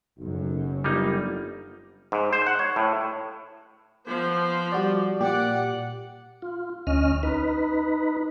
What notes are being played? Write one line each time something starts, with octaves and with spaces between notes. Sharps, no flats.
F#1 B1 F#2
G1 G3 A#3 D#4
G#2
C5
F#5
C#5
A2
F3 B3 C5
G3 F#4 D5
A#2 G4 D5 F#5
F4
D2 C#4 D#5 F6
D#4 B4